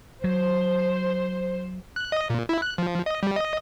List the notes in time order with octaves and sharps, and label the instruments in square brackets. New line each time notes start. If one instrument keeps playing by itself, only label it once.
[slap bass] F#3 [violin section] C5
[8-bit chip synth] F#6
D#5
A#2
E4
F#6
F3
D#5
G3
D#5